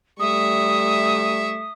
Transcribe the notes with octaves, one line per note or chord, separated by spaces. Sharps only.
G3 A3 E5 C#6 D#6